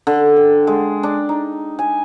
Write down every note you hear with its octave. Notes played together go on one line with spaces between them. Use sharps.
D3
G5
G#3
D4
D#4
G#5